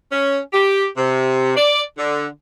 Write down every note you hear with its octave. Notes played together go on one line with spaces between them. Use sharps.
C#4
G4
C3
D5
D3